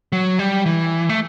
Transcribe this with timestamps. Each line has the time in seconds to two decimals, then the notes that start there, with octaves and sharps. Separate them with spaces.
0.12 F#3
0.39 G3
0.66 E3
1.09 A3